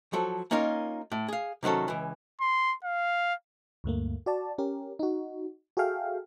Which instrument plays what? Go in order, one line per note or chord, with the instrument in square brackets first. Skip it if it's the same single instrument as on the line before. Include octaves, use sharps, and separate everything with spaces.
[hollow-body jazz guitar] F3 F#3 A4
A#3 C#4 D#4 F4 A#4
A2
G#4 F5
C3 D#3 F#3 C#4 A4
C#2 E3
[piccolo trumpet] C6
F5
[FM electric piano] D2 G2 A3 A#3
F#4 D5 A5
C#4 G4 A#4
D#4 F#4
F#4 G#4 A4 E5 F5 G5